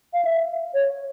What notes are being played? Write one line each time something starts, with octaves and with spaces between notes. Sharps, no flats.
F5
E5
C#5